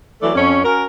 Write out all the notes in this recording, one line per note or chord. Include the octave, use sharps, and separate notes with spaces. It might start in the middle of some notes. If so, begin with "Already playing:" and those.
E3 F#3 A3 A4 D5
F2 C#4
C#4 F#4 A#4